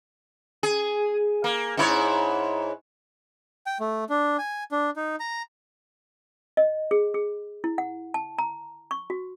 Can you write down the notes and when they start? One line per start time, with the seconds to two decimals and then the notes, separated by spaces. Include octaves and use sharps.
0.63 G#4
1.44 A#3
1.77 G#2 E4 C#5
3.66 G5
3.80 A3
4.09 D4
4.38 G#5
4.72 D4
4.96 D#4
5.20 A#5
6.57 D#5
6.91 G#4
7.14 G#4
7.64 E4
7.78 F#5
8.14 A5
8.39 A#5
8.91 C#6
9.10 F#4